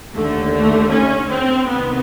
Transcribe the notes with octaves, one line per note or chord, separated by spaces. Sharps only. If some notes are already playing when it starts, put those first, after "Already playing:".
D#2 D3 A3
A3
C#4
C4
C2 C3 D#3 B3